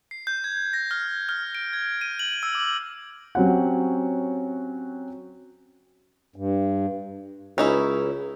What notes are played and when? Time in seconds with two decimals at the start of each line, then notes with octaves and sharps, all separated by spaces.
0.11 C7
0.27 G6
0.44 G#6
0.73 A#6
0.91 F6
1.29 F6
1.55 D7
1.73 G#6
2.01 D#7
2.19 F#7
2.43 E6
2.55 D6
3.35 F#3 C4 C#4 G4 F#5
6.36 G2
7.58 C#2 C#4 D#4 E4